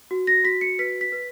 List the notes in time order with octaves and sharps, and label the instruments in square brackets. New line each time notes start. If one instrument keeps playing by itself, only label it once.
[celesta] F#4
A#6
F#4 B6
C#7
B4 B6
B6
B4